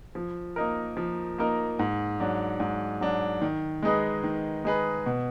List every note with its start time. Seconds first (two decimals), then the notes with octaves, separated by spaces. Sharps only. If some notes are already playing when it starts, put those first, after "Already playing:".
0.15 F3
0.56 A#3 D#4 A#4
0.97 F3
1.38 A#3 D#4 A#4
1.79 G#2
2.20 F#3 D4
2.60 G#2
3.01 F#3 D4
3.41 D#3
3.83 G#3 D#4 G#4 B4
4.24 D#3
4.64 G#3 D#4 G#4 B4
5.06 B2